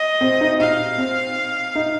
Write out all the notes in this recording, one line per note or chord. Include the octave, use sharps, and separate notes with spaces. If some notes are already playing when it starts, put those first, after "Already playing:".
Already playing: D#5
C4
D#4
D#4 F5
C4
D#4